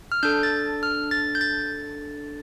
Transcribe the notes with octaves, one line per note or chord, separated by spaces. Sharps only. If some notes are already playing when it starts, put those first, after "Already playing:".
F6
D4 A4 G6
A6
F6
A6
G6
A6